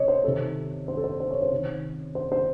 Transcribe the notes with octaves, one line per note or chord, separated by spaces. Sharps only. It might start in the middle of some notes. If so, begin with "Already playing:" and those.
Already playing: C3 C#5 D#5
C5
C3 D#3 A4
C5
A4
C5
C5
C#5
C5
C3 D#3
C5
C5